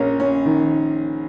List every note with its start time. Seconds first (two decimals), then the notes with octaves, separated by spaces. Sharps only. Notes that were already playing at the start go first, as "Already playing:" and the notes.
Already playing: A#1 A#3 C#4
0.20 C#4
0.46 D#3